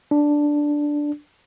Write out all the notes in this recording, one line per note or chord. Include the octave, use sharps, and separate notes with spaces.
D4